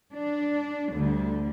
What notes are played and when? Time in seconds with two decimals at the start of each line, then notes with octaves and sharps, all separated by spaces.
0.12 D4
0.91 D2 D3 G3